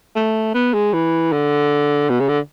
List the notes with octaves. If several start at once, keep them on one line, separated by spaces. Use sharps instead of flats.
A3
B3
G#3
E3
D3
B2
C#3
D3